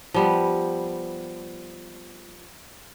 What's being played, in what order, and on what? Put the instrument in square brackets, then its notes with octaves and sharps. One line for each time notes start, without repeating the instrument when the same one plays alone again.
[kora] F3 G3 B3